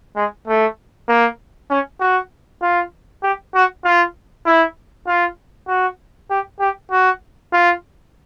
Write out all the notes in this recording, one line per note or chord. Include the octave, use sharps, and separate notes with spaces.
G#3
A3
A#3
C#4
F#4
F4
G4
F#4
F4
E4
F4
F#4
G4
G4
F#4
F4